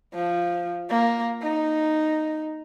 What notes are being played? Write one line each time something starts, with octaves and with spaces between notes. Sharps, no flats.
F3
A#3
D#4